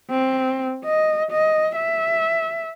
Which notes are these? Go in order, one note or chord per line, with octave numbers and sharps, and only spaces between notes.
C4
D#5
D#5
E5